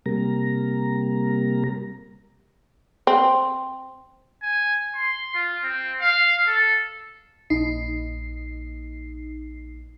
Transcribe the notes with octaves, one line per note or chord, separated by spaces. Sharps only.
C3 G3 A#3 A#5
C4
G#5
C6
F4
C4
F5
A4
A#1 D#4 C7